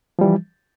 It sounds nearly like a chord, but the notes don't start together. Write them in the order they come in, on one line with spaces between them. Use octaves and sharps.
F3 G3 E3